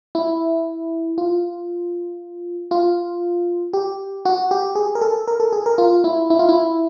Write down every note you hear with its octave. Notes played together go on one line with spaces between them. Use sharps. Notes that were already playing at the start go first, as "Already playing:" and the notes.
E4
F4
F4
G4
F#4
G4
G#4
A#4
A4
A#4
A4
G#4
A#4
F4
E4
E4
F4
E4